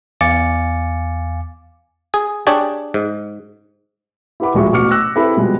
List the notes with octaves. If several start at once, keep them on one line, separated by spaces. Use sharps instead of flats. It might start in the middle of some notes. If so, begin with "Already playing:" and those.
E2 F5 G#5 D6 A6 C#7
G#4
D4 G4 G#4 C#5 D5
G#2
E4 G4 B4 F#5 B5 D6
D1 F3 G3 G#3 E5 C#6
A1 B2 C#6 D6 F6 C#7
D6 E6 F#6 A#6
C4 E4 G4 A4 B4 B5
B2 F3 G3 G#3